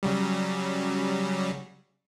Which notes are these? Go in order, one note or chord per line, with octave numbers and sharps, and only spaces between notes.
C#3 F#3 G3